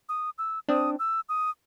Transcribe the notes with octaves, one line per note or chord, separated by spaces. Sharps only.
D#6
E6
C4 D4 D#6
E6
D#6